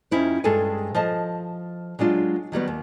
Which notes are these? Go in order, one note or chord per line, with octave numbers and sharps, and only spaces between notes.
F2 C#4 D#4 E4 C5
G2 G#3 G#4 A4 G#5
F3 D#5 A5
F#3 G#3 D4 F4
D#3 F#3 G3 B3
D#2